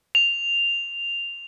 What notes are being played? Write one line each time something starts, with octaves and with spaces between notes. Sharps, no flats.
F7